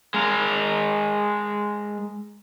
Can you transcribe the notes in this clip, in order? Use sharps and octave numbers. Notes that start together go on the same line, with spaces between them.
G#3 A#4